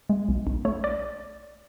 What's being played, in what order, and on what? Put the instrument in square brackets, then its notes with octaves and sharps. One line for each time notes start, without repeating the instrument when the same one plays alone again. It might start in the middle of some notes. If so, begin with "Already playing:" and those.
[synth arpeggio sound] G#3
B1
B1
A3 C#5
D5